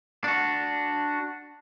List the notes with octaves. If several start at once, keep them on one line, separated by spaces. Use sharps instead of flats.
D4 F#4